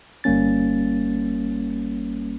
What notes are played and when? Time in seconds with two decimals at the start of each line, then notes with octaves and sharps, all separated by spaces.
0.24 G1 G3 A#3 C#4 A6